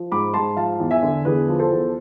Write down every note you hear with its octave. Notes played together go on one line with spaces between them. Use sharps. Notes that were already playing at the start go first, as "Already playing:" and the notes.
Already playing: F3
G#2 B5 D6
G#2 A5 C6
F3 F5 A5
E2
E5 G#5
D3
E2 G#4 B4
F3
A4 C5
E2